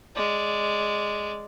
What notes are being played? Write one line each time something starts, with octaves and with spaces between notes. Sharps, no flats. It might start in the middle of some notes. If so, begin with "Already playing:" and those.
G#3 D5